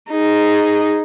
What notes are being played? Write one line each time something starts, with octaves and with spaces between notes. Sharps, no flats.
D#4 G#4